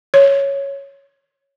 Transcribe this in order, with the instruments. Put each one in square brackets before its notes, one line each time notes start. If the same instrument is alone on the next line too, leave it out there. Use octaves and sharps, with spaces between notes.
[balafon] C#5